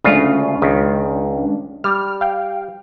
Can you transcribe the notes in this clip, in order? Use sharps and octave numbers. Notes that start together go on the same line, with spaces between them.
D2 C#3 G#3 C#4 D4 F4
C#2 D#3
G3 F6
F5 G5